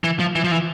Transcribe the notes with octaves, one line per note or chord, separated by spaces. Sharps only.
E3
F3
E3
F3
E3